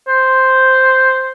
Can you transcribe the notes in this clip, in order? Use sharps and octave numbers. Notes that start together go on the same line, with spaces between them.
C5